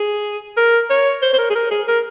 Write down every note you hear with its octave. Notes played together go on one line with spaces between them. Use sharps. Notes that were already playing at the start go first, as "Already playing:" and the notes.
Already playing: G#4
A#4
C#5
C5
C5
A#4
G#4
A#4
G#4
A#4